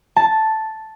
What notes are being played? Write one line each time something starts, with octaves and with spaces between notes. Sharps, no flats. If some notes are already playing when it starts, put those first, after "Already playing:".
A5